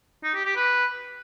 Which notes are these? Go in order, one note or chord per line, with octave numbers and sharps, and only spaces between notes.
D#4
G4
G4
B4